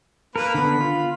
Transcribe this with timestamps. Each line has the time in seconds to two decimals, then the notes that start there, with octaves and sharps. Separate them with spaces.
0.36 A#3 A#4 B4
0.54 D3 B3 B5
0.81 F4